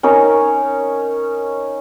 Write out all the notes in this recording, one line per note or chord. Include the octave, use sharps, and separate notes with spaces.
C#4 D#4 A#4